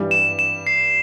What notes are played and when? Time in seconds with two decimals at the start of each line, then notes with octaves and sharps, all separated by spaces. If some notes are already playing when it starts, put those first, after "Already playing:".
Already playing: G2 E3 G3
0.11 E7
0.39 E7
0.67 C7